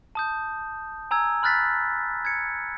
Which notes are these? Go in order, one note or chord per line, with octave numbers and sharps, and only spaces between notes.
A5 D#6 G6
G#5 A#5 E6 G#6
B5 F6 F#6 A6 B6
G#6 C#7